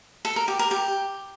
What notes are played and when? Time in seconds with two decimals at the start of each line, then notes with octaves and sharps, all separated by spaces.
0.25 A4
0.36 A#4
0.48 G4
0.59 A#4
0.71 G4